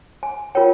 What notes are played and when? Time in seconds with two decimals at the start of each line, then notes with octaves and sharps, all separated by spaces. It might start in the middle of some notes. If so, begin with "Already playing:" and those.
0.23 G#5
0.55 F4 A#4 C#5 G5